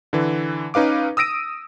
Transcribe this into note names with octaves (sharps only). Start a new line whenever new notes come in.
D3 E3
C#4 D#4 B4 F5 D6
D#6 E6 A#6 D7 D#7